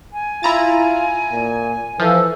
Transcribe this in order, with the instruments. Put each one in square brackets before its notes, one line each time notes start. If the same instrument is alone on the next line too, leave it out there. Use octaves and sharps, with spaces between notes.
[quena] G#5
[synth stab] E4 A#5 A6 [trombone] F4
[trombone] A#2
[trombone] E3 [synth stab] F3 [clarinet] A4